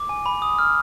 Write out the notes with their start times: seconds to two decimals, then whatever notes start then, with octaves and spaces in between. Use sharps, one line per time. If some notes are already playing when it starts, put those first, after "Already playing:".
Already playing: D6
0.09 G#5
0.26 B5
0.42 D#6
0.59 F6